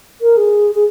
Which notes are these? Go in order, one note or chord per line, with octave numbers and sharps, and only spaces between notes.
A#4
G#4
G#4